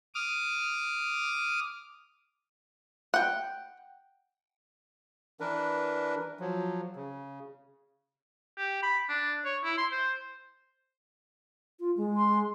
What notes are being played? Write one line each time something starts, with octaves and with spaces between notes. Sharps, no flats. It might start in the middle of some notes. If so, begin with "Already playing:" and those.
D6 D#6 F6
F#5 G5
E3 D4 A#4 B4
F3 F#3
C#3
G4
B5
D4
C#5
E4
C6
C5
F4
G#3
C6